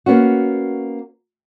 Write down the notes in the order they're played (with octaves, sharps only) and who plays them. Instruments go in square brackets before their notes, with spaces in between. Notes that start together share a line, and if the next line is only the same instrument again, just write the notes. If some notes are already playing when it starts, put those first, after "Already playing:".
[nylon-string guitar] A#3 B3 C#4 F#4